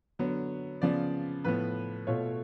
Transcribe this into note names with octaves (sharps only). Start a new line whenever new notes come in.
D3 F#3 B3
C#3 F3 B3 D5
A2 F3 B3 B4
B2 A3 F4 C#5